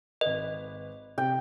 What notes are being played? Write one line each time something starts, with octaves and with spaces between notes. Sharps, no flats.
G#1 B4 D#5
C3 G5